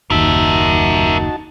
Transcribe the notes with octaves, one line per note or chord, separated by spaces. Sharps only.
F#1 D#2 D#4 F#4 A#4 E5 A5